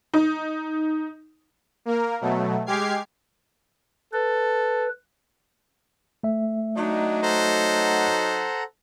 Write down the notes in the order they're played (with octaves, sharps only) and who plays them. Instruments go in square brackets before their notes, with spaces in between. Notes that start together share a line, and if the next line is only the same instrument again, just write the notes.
[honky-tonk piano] D#4
[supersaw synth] A#3 A#4
B2 F#3 A3
G#3 G4 D6 F6 G#6 C7
[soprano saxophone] A4 [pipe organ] B4
[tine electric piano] A3 E5
[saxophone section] F#3 D#4 [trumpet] D4
[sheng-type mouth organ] A4 F#5 A#5 [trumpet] C5